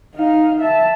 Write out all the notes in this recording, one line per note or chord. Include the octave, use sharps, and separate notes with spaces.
D#4 F5
E5 A5